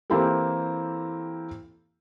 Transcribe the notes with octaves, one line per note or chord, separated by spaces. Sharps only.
E3 A#3 C4 E4 G4 A4